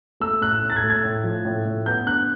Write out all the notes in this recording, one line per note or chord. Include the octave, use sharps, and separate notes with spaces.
A3 E6
A2 F#6
A2
A6
G#6
A3
G#6
A2
F3
A2
A2
B3 G6
D3 F#6